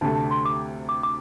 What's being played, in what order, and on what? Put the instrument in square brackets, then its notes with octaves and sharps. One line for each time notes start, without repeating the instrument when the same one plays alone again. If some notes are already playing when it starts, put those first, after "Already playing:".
[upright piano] D2 C3 A3 [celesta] A5
[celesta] A5
C6
D6
D6
D6